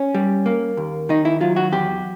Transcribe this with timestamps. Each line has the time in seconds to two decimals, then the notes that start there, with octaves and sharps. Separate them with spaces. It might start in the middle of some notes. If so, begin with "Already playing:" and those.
Already playing: C#4
0.14 G3
0.46 A#3
0.77 D#2
1.09 D#3 D#4
1.25 E4
1.41 F#3 F4
1.56 F#4
1.72 E2 G4